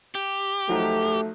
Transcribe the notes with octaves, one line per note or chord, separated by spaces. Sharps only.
G4
F3 F#3 A3 D#4